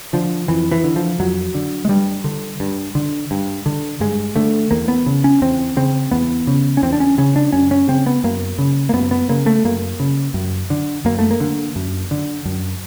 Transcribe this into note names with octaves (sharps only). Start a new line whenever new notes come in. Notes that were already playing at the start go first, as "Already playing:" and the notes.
D3 F3
F2 E3
E3
D3
F3
F2 F#3
D3
G#3
G2 G3
D3
G2
D3
G2
D3
G2 G#3
D3 A3
E2 A#3
B3
C#3
C#4
E2 C4
C#3 C4
E2 B3
C#3
C#4
E2 C4
D4
C#4
C#3 C#4
D4
F#2 C#4
C#4
C#3 C4
B3
F#2 A#3
C#3
A#3
F#2 B3
B3
C#3 A#3
A3
F#2 A#3
C#3
F#2
D3
F#2 A#3
A3
A#3
D3
F#2
D3
F#2